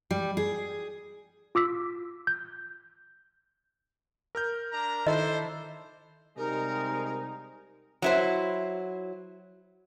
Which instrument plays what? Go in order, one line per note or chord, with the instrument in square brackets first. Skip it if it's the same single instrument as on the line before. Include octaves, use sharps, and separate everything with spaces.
[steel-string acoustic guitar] G3
G#4
[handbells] F4 D6 E6 B6
G6
[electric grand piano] A#4 F6 G6
[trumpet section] D4 A#5
[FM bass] D#3 [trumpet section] D4 C5 [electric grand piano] E4 A4 E5 [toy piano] D#5
[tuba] C3 [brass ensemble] G3 G#3 [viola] D#4 [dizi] A#4
[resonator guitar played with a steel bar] F#3 E4 C5